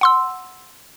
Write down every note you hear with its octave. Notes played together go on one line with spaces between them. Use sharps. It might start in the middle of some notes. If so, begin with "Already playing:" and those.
F#5 C6 E6